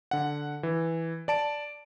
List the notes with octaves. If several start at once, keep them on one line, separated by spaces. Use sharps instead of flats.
D3 F#5
E3
D5 A5 D7